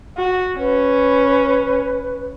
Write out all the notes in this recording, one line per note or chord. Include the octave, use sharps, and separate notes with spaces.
F#4
C#4 B4